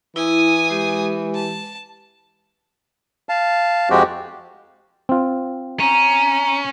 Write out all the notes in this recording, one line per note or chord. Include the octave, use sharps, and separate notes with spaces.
E3 E4 G#5 D#6
G#3 G4
A5
F5 A5
F2 G#3 C4 F#4 G4
C4 F4
C#4 A#5